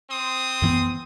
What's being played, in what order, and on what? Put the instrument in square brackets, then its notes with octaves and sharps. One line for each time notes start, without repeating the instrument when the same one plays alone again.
[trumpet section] C4 C6 D#6
[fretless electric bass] F#2 E3 B3